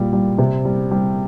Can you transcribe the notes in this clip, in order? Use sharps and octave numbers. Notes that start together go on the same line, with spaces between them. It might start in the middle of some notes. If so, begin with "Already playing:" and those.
Already playing: A#2 G3
G3
C3
G3
G3